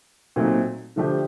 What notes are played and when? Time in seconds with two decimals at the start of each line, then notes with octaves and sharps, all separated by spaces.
0.36 A#2 F#3 A3 C4 D#4
0.96 D3 F3 A3 D4 G4